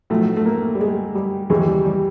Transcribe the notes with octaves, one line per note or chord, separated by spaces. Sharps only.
B1 A2 F3 A3
A3
A#3
G3
G#3
G3
D#2 C#3 E3 G#3
G3
G3